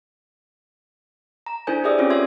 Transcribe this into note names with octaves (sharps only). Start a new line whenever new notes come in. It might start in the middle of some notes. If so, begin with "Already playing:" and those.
A#5
D4 E4 A4 C5 G#5 G6
G4 G#4 B4 D5 E5 D#6
C4 C#4 F4 G4 C#5 D6
A4 E5 C6 D#6 G#6